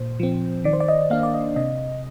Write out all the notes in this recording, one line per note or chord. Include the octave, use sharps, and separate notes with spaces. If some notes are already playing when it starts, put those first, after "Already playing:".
Already playing: A#2 C5
F3 C4
D#3 D5
C5
D5
D#5
A#3 D4 F5
D5
D#5
C3 D#5